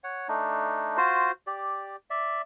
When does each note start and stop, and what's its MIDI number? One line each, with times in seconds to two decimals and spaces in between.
0.04 0.28 73
0.04 0.28 78
0.28 0.97 57
0.28 0.97 62
0.28 0.97 63
0.97 1.31 65
0.97 1.31 66
0.97 1.31 72
1.47 1.96 67
1.47 1.96 74
2.10 2.42 74
2.10 2.42 76